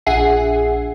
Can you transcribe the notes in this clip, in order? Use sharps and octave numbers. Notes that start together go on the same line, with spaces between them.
A#1 G#4 E5 F#5 G#5 C7